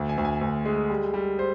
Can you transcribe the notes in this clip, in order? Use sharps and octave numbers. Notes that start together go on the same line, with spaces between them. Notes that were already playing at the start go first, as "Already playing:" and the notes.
Already playing: D2
G#5
D2
G#5
D2
G#3
G3
G3
C5